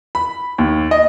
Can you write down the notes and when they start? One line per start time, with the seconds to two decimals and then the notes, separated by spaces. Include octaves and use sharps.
0.15 B5
0.58 D#2
0.91 D#5